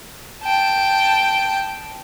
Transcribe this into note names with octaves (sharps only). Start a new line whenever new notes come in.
G5 A5